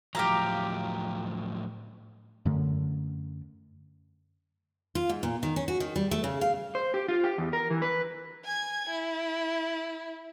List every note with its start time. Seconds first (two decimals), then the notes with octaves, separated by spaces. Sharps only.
0.15 A2 F3 F#3 G4 F5 A#5
2.45 F#2 D3 A3
4.95 F4
5.09 G#2
5.23 A#2
5.43 D#3
5.56 C#4
5.68 F#4
5.80 D#3
5.96 G3
6.11 A3
6.24 C#3
6.41 F5
6.75 C5
6.94 G4
7.08 F4
7.24 G4
7.38 E2
7.53 A#4
7.70 E3
7.82 B4
8.44 G#5 G#6
8.89 E4